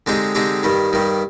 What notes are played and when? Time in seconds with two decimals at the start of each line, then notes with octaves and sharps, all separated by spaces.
0.06 D3 G#3 C4 D#4 G4
0.35 D3 G#3 C4 D#4 G4
0.63 G2 D#3 G3
0.93 G2 D#3 G3